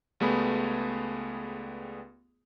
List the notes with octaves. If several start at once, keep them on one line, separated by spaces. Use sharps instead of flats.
C#2 G3 A3 B3 G#4 B5